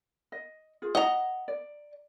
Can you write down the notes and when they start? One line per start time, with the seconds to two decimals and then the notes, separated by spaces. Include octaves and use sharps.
0.32 D#5
0.82 F4 G#4
0.95 D#5 F#5 A#5
1.48 D5